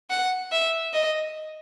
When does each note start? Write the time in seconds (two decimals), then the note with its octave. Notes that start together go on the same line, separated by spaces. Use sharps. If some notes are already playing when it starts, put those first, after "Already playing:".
0.10 F#5
0.52 E5
0.93 D#5